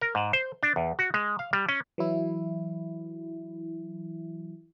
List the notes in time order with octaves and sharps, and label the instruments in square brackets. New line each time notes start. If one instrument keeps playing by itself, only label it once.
[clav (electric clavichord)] A#4
G#2
C5
D4
E2
F#4
G#3
F5
G3
C#4
[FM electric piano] E3 F#3 E4